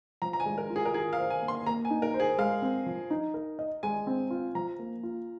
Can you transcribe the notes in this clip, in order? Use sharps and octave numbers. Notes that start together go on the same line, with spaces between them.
F3 A#5
A#5
G#5
G#3
A#4
F4
G#4
A#4
F4 G#4
F5
C5
G#5
A#3
C6
A#3 A#5
G#5
D#4
A#4
C5
G#4
G#3 F5
C4
F3
D#4
A#4
D#5
G#3 G#5
C4
F4
F3 A#5
A#3
F4